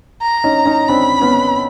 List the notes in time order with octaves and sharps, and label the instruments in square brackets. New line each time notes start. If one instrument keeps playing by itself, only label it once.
[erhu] A#5
[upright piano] C#4 D#4
C#4 D#4
[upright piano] C4 D4 [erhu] B5
[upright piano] B3 C#4